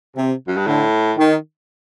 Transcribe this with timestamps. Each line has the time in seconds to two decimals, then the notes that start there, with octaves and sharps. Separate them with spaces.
0.16 C3
0.47 F#2
0.57 G2
0.67 A2 D3
1.17 D#3